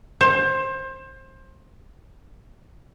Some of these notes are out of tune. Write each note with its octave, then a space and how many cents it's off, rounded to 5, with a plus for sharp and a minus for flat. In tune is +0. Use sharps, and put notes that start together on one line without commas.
C5 +25